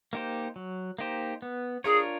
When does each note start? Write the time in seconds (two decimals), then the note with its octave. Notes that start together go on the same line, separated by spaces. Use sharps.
0.13 A#3 D#4 G4 C5
0.56 F#3
0.99 A#3 D#4 G4 C5
1.42 B3
1.84 D4 F4 G#4 A#4 C#5